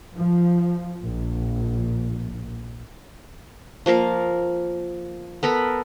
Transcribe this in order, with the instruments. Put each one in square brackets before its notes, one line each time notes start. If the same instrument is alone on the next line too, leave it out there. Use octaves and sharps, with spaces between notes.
[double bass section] F3
A#1
[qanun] F3 A#3 A#4 F5
B3 A4 A#4 B5